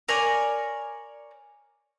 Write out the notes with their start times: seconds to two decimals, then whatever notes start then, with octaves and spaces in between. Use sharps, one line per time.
0.09 A#4 C#5 D5 G#5